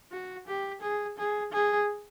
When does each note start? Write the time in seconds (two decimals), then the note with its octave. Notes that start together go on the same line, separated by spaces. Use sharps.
0.12 F#4
0.47 G4
0.81 G#4
1.18 G#4
1.52 G#4